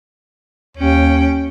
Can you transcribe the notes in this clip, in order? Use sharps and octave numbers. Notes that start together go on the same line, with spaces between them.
D#2 C#4 G5